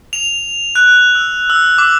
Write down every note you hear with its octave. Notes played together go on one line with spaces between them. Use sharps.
F7
F#6
E6
E6
D6